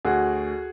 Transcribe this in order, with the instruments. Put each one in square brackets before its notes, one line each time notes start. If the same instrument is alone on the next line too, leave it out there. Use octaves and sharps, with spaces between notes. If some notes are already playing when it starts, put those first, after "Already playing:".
[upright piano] D2 F#4 G#4